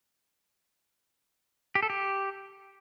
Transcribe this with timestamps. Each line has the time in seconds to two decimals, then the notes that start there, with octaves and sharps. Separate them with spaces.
1.75 G4
1.83 A4
1.90 G4